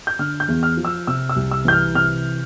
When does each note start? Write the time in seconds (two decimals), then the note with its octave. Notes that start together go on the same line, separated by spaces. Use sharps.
0.07 G6
0.19 D3 F6
0.40 G6
0.48 E2
0.63 F6
0.77 F3
0.85 E6
1.07 C3 E6
1.29 E6
1.36 C2
1.51 E6
1.65 E3 G6
1.73 F6
1.94 C3 F6